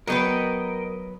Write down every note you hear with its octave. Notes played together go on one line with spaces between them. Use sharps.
F#3 B3 A#4 B4 D#5 G5